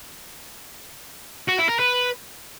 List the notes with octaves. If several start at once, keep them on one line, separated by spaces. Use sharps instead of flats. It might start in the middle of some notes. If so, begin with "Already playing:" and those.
F#4
E4
A#4
B4